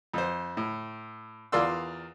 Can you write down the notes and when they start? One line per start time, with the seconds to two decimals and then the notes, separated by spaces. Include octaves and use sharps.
0.14 F2 C5
0.57 A2
1.52 E2 F4 A#4 D5 C6 E6